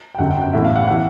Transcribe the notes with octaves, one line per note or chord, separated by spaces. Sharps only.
G5
G1 F#2 D3 F#5
G5
F#5
A1 A2 E3 E5
F5
F#5
F#5
E3